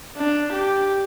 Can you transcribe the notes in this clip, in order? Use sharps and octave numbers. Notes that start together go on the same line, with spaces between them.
D4
G4